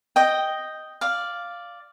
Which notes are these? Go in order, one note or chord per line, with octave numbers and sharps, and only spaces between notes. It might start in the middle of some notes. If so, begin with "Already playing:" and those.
D#5 G5
D5 F5